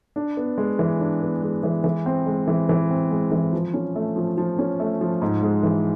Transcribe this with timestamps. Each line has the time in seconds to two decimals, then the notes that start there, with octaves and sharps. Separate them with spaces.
0.16 D4
0.37 B3
0.58 G#3
0.79 E3
1.00 D4
1.21 B3
1.42 G#3
1.63 E3
1.84 E3
2.06 C4
2.27 G#3
2.48 E3
2.69 E3
2.90 C4
3.11 G#3
3.32 E3
3.53 F3
3.74 C#4
3.96 A3
4.16 F3
4.38 F3
4.59 C#4
4.80 A3
5.01 F3
5.22 G#2
5.43 G#3
5.63 E3